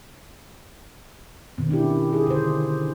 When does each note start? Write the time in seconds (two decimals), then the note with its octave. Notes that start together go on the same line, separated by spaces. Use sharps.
1.58 B2 D#3 C4
1.69 C#4 D4 E4 G4
2.13 D#4 G#4
2.27 D3 C5